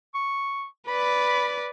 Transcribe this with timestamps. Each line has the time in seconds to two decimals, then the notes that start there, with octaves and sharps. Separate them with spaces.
0.15 C#6
0.88 B4 D5 B5